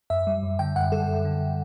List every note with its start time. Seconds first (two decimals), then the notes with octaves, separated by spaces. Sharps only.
0.10 F#2 E5
0.27 G3
0.43 F#2
0.59 D3 G5
0.76 F#2 F#5
0.92 G3 A4
1.08 F#2
1.25 D3